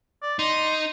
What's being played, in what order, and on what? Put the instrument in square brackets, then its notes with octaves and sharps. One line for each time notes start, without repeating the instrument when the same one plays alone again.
[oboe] D5
[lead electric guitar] D#4 [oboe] C6